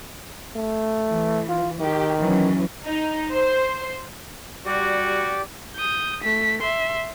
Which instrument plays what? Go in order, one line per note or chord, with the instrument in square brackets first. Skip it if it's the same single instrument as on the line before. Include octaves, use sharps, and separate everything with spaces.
[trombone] A3
[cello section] E3
[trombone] F4
[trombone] D#3 [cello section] G4
[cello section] E3 F#3 C#4
[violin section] D#4
C5
[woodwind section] G3 F#4 [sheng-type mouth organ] G4 D5
[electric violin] D#6 G6
A3 B6
E5 C6